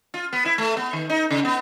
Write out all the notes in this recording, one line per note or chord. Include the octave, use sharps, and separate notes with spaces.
F4
B3
E4
A3
B3
D#3
D#4
C#3
B3